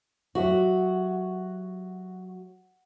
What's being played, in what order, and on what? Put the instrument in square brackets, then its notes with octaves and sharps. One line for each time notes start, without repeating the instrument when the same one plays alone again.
[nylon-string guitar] F#3 G4 E5 [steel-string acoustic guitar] F#4